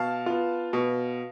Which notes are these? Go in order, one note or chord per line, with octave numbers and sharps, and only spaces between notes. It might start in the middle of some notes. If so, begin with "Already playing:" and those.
Already playing: B2 F5 A5
B3 F4
B2